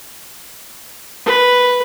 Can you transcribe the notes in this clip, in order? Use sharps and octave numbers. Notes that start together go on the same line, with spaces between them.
B4